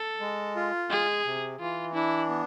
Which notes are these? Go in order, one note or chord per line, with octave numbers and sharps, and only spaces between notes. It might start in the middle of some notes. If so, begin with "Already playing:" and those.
Already playing: A4
G#3
F4
G#3 G#4
C3
E3 F4
D4 E4
B3